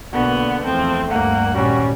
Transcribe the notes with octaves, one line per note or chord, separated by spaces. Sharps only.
B1 D3 A#3 B3 F#4
E2 F3 A3 C4
D2 G2 A#3 F#5
G#1 A#2 G3 C#4 F#4